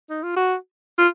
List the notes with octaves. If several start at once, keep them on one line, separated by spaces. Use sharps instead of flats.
D#4
F4
F#4
F4